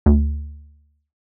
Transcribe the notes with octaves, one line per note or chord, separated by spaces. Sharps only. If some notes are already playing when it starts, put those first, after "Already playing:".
D2